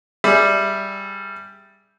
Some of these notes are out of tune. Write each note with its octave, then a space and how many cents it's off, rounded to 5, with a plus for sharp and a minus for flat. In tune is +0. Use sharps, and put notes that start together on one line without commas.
G3 +0 G#4 +0 E5 +0